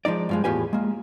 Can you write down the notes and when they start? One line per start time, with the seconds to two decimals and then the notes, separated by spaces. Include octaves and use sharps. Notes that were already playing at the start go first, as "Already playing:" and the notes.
0.05 F3 G#3 D#4 D5
0.29 G2 F3 G#3
0.44 E2 A2 F4 G4 B4 G#5
0.73 G#3 A#3